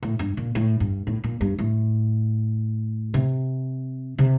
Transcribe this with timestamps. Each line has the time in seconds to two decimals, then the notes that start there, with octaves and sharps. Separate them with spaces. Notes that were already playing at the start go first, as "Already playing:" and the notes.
0.03 A2
0.19 G2
0.37 A#2
0.55 A2
0.80 G2
1.07 A2
1.24 A#2
1.41 G2
1.59 A2
3.14 C3
4.18 C3